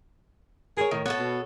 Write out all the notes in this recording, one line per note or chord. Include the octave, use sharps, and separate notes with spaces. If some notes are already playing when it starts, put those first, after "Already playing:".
G#4 A#4 C5 C#5
A2 D#3
B3 F#4 A4 C#5
B2